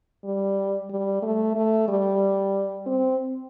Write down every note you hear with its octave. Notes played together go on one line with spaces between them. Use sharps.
G3
G3
A3
A3
G3
C4